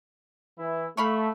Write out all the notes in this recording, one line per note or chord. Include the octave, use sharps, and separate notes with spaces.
E3 E4
A3 F5 B5 C#6